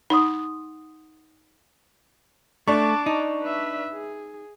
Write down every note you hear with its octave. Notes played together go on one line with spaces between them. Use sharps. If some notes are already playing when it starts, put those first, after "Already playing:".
D#4 F#5 C6 D#6
A3 D4 A5 C#6 D6
D#4
B4 E5
G#4